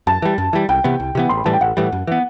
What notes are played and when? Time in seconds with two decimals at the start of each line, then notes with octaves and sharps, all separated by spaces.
0.07 F#2 A5
0.22 E3 G3
0.38 F#2
0.53 E3 G3
0.69 C2 G5
0.84 C3 E3 B3
1.00 C2
1.15 C3 E3 B3
1.29 A1 C6
1.37 B5
1.45 A2 E3 G3 A5
1.53 G5
1.61 A1 F#5
1.77 A2 E3 G3
1.92 F#2
2.07 E3 B3